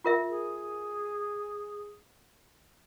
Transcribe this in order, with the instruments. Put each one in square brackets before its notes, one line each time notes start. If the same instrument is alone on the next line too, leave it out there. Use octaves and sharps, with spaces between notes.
[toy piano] F4 A#4 E5
[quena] G#4